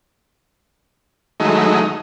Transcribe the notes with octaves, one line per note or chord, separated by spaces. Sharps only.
D#3 F#3 G#3 A3 D#4 E4